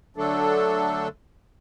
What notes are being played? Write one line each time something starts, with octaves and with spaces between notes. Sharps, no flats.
D3 F#3 A3 D4 A4